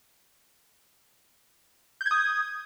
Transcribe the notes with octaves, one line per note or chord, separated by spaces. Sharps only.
G6
G#6
D#6